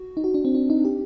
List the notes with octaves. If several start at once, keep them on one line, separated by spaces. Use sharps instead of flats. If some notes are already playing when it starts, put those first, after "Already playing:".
Already playing: F#4
D#4
F#4
D4
C4
D4
D#4
G4